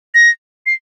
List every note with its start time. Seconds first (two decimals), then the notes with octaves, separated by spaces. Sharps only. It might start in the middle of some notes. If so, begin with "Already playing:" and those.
0.14 A#6
0.66 C7